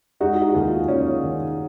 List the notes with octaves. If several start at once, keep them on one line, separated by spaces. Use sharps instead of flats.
G#3 D#4 F#4
F#4
D#2 F4 G#4
D#2 C#4 F4
D#3